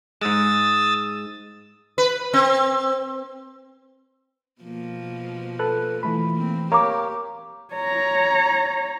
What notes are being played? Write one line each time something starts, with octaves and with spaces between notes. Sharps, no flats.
G#2 G#3 D#6 E6 A6
B4
C4
B2 F3 A#3
A4 B4 F#6
E3 A3 B5
A#3 C4
G4 A#4 C#5 F5 A#5 D6
C#5 A#5